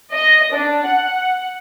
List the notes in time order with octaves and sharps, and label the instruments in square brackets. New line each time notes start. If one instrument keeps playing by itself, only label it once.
[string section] D#5
D4
F#5